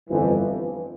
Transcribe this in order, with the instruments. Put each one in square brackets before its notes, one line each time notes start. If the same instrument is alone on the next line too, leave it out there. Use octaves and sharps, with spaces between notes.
[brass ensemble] G1 F2 E3